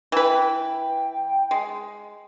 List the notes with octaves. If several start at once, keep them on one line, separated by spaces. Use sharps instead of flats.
E3 B4 G5
G#3